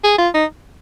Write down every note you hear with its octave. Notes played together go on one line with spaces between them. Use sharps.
G#4
F4
D#4